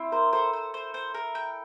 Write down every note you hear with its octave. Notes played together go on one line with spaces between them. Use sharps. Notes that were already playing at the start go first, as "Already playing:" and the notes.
Already playing: C4 E4
A#4 C5
A4 C5
C5
C5
C5
A#4
G5